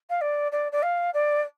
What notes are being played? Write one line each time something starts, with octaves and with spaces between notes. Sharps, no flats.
F5
D5
D5
D5
F5
D5